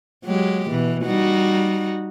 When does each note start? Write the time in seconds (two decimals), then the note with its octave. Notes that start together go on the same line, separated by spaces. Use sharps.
0.25 F#3 G#3 G4
0.70 B2 E3
1.05 G3 D#4 F#4